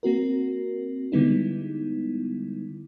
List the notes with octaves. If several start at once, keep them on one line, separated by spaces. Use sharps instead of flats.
A#3 C4 F#4 A#4
D3 G3 G#3 B3 D#4 E4